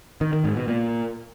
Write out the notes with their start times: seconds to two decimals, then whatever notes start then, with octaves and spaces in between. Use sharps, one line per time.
0.21 D#3
0.33 D#3
0.44 G#2
0.56 B2
0.68 A#2